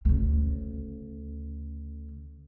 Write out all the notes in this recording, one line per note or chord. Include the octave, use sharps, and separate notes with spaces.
D2 C#3